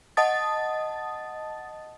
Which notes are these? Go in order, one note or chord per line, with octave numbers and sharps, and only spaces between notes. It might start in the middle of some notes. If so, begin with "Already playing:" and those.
D#5 F#5 A5 D#6 A6